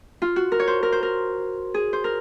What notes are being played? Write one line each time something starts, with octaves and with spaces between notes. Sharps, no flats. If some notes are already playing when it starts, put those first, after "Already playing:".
F4
F#4
A#4
C#5
C5
A#4
C5
A#4
G#4
C5
A#4